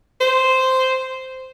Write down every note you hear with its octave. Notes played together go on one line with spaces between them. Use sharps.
C5